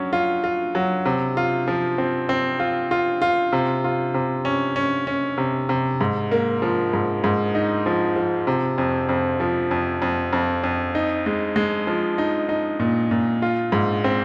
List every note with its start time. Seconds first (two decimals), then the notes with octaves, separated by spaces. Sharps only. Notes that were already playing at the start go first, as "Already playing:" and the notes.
Already playing: F#3 C#4
0.13 F4
0.44 F4
0.75 F#3
1.05 C3
1.37 F4
1.68 F3
1.98 C4
2.29 C4
2.60 F4
2.91 F4
3.22 F4
3.53 C3
3.84 F4
4.14 C3
4.45 C#4
4.76 C#4
5.07 C#4
5.38 C3
5.69 C3
6.01 G#2
6.31 A#3
6.62 F3
6.93 G#2
7.24 G#2
7.55 D#4
7.86 F3
8.16 F3
8.47 C3
8.78 F2
9.09 F2
9.40 F3
9.71 F2
10.02 F2
10.33 F2
10.64 F2
10.95 D#4
11.26 G#3
11.56 G#3
11.87 F3
12.18 D#4
12.49 D#4
12.80 A#2
13.11 A#2
13.42 F4
13.72 G#2
14.04 C4